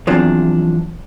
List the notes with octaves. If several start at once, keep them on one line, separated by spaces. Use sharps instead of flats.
E2 C3 F3 F#3 D4